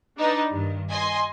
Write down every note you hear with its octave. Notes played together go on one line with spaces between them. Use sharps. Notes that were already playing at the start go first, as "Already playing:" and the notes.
D4 D#4 B4
G2 D#3
D#5 G#5 C6